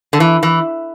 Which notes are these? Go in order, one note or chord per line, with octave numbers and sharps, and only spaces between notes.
D3
E3
E3